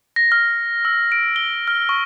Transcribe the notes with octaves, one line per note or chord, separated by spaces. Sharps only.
A#6
F6
E6
D7
G7
F6
C#6